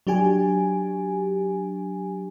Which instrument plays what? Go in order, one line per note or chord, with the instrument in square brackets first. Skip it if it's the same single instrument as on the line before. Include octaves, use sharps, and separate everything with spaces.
[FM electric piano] F#3 D4 G4 G#5